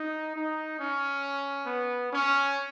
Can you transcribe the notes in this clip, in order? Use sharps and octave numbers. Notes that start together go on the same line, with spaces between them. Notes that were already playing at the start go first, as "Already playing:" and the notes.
Already playing: D#4
D#4
C#4
B3
C#4